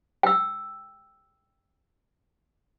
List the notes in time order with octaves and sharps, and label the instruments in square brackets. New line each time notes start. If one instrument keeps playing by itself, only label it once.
[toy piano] G5 E6